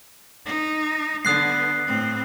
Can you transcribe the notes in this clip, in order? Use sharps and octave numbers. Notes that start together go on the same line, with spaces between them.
D#4
D3 B3 D#6 F#6 C7
A2 C4